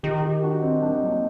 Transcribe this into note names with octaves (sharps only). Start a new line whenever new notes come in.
D#3 D#4 G4
D#4 G4
D4 F#4
C4 D#4
G3 D4
D#4
F#3 A#3 D4